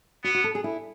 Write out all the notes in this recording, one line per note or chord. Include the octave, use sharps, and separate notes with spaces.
B3 F#4
F#4
A4
G#4
E4